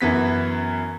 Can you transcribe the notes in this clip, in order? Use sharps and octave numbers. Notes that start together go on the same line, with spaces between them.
F#2 E3 B3 B6